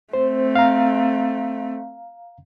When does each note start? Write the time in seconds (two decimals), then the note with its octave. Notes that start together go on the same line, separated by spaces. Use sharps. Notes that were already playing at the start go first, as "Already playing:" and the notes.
0.13 A3 C4 C5
0.55 F5 A#5